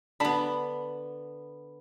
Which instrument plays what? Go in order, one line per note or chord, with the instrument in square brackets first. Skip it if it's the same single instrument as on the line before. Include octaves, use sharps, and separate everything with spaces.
[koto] D3 B3 [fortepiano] A5 B5